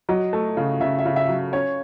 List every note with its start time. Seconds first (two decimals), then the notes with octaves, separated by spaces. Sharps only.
0.09 F#3 D#5
0.33 A3
0.57 C#3
0.80 C#3 E5
0.99 E5
1.05 C#3
1.16 E5
1.29 F#3
1.53 C#4 C#5